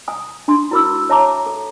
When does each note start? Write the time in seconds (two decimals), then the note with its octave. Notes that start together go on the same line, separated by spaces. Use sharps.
0.08 G#5 D#6
0.48 D4 G#5 C6
0.71 E4 F#4 A#4 B5 D6 E6
1.09 C#5 E5 A5 A#5 D6
1.47 A4